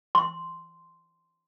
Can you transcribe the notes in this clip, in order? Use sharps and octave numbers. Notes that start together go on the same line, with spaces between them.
C6